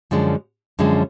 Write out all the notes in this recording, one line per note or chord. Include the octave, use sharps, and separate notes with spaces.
F#2 D3 F3 G#3 C#4
F#2 D3 F3 G#3 C#4